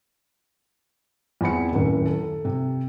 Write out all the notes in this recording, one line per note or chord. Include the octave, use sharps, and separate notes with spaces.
E2 C4 B5 C#7
D#1 F#2 A2
A4
C3